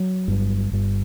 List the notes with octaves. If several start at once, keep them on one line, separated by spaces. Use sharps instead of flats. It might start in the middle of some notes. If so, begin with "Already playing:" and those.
Already playing: F#3
G1 G2
G1 G2